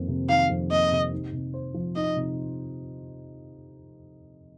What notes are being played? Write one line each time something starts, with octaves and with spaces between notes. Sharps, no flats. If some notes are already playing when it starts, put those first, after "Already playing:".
Already playing: F2 D#3 A#3
C3
D#3 F5
F2
A#3 D#5
C3
D#4
C3
C5
F3
D#4 D#5
C3